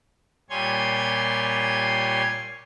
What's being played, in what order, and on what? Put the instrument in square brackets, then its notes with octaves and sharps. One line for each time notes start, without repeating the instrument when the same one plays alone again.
[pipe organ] A#2 G3 C#5 G#5 C6 G#6